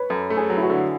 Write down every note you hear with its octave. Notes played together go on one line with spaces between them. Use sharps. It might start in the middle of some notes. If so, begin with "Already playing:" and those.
Already playing: B4 C#5
F#2 A4
A3
G#4
F#3
E4
F#4
D3